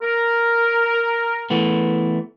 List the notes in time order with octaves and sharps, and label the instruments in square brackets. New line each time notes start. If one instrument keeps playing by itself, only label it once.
[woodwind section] A#4
[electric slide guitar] E3 A3 B3